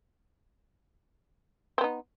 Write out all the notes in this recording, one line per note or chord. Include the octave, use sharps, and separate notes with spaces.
B3 C4 D#4